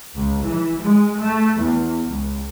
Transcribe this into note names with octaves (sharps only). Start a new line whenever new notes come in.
C#2
E3
G#3
A3
E2
C#2